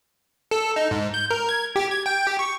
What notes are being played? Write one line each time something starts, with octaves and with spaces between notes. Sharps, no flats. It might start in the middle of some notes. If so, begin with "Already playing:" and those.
A4
D#4
G#2
G6
A#4
G#6
G4
G#6
G5
G4
C#6